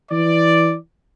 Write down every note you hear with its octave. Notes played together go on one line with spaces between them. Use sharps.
E3 D5